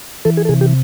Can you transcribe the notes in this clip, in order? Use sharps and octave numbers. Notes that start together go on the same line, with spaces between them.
E3 A4
G#4
A4
C3 G#4
G4